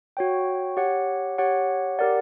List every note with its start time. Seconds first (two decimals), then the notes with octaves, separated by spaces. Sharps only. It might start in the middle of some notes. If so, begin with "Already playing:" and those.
0.17 F#4 C#5 G5
0.77 G4 C#5 F#5
1.38 G4 C#5 F#5
1.99 G4 A#4 D5 F#5